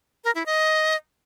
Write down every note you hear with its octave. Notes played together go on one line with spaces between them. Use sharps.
A#4
E4
D#5